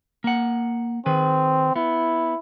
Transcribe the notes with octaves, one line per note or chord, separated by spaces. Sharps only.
A#3 F#5
D#3 C4 G#4 B4
B3 E4